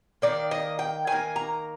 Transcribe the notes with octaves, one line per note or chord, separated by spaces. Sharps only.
D#3 A#3 D5
D#5
G5
D#3 A#3 G#5
A#5